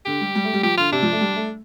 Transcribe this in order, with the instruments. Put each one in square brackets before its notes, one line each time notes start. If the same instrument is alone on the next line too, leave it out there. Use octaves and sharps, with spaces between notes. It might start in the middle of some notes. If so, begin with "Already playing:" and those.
[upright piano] D3 [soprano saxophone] G4
[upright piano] G3
G3
A3
G3
[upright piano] F3 [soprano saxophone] G4
[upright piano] D3 [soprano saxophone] F4
[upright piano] C3 [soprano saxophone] D4
[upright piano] F3
A3
G3
A3